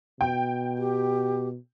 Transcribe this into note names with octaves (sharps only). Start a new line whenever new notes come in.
B2 G5
G4